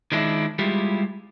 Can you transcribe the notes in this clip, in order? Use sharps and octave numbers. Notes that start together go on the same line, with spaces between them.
D#3 F3 G#3 D4 E4
G3 G#3 E4 F4 G4